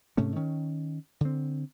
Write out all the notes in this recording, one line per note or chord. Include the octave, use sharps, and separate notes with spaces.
G#2 C3 A3 C#4
D#3 C#4
D3 C4